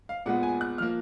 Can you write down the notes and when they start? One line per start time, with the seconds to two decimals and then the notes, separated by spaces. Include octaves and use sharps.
0.09 F5
0.26 A#2 G#3 B3 F#5
0.43 G#5
0.61 F#6
0.78 F3 A#3 F6